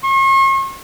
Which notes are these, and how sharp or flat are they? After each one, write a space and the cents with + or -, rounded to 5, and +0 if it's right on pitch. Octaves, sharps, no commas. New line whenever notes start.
C#6 -45